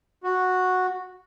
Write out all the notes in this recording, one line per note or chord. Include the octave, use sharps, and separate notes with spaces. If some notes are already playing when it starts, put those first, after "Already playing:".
F#4